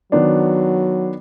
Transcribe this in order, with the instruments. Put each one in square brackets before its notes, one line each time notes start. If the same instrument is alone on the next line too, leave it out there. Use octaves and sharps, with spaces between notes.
[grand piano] D#3 B3 D4 [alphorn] F#3